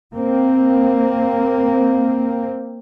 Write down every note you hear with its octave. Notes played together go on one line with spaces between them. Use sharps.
A#3 C4